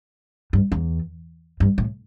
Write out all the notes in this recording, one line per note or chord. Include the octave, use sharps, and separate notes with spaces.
G2
E2
G2
A2